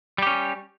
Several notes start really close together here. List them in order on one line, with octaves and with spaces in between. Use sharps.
G3 G4 C#4